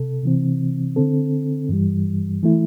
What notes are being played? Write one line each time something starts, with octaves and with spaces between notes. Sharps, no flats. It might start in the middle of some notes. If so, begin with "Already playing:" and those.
Already playing: C3 A4
C3 E3 C4
D3 C4 A4
G2 E3 G3
E3 A3 E4